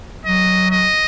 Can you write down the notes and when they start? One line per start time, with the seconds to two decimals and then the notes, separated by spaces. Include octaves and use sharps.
0.25 F#3 D#5
0.71 D#5